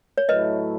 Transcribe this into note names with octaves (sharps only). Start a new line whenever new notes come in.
C#5
A2 F#3 A3 E4 B4 D#5